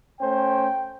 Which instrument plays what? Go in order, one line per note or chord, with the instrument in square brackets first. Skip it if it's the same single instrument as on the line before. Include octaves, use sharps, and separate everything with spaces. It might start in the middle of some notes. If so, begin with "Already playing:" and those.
[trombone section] A3 C#4 C5 [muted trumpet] G5